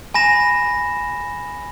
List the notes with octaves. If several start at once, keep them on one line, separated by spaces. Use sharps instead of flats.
G#5 B5 A#6 E7